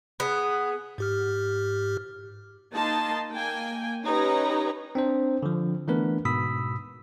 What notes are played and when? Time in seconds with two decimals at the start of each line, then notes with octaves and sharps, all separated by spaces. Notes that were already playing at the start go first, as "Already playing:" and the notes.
0.20 B3 G#4
0.98 G#2 G4 F6
2.73 A#3 D#4 D#5 A5 C6
3.33 A#3 G5 G#5
4.04 C#4 D#4 G4 B4 C#5 A#5
4.95 C4 D4 C5
5.43 D3 F3
5.88 E3 A3 B3 D4 A#4 B4
6.25 G#2 B2 B5 D#6 E6 B6